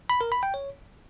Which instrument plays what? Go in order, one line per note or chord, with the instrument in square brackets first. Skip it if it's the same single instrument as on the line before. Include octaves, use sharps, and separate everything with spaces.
[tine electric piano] B5
A#4
B5
G5
C#5